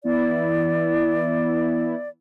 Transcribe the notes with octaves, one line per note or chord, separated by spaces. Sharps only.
E3 B3 E4 D5